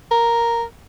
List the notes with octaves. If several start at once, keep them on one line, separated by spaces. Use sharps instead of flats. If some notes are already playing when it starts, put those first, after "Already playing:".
A#4